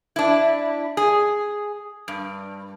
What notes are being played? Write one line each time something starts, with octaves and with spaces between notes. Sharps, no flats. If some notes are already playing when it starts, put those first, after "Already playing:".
D4 E4
G#4
G2